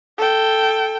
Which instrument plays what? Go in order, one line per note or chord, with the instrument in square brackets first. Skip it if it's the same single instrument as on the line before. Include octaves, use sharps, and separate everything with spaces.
[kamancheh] A4 G5